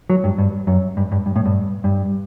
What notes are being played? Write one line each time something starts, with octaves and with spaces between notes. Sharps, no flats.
F#3
G2
G2
F#2
G2
G2
G2
A2
G2
G2